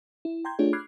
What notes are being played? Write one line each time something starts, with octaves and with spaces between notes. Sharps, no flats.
E4
G5 A#5 C6 G6 G#6
A3 D4 F4 G4 G#4 C#5
B5 D6 F6 F#6 G#6 C7